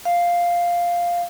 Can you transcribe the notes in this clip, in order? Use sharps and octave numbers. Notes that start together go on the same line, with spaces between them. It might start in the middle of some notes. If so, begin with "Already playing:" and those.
F5